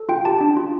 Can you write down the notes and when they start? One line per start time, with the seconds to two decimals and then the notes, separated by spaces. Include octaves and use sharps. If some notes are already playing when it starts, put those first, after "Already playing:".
Already playing: A4
0.09 F4 G5
0.25 G4 A5
0.41 D4
0.57 F4